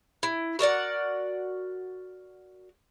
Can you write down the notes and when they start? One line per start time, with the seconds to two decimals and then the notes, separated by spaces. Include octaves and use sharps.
0.23 E4
0.59 F#4 A#4 D5 F#5